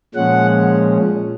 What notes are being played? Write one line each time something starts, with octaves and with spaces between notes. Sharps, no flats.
A#2 F3 G#3 C#4 F#5